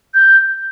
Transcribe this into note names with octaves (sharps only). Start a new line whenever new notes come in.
G6